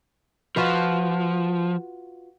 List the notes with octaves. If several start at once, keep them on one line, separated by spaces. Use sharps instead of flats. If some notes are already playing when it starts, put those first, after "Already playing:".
F3 F4 F#4 B4